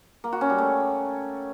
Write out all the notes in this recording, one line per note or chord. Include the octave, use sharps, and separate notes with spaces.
A#3
F#4
C#4
G3
A3